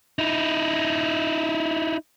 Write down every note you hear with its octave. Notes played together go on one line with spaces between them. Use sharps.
D#4 E4